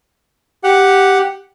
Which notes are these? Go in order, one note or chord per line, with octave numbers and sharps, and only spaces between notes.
G4 F#5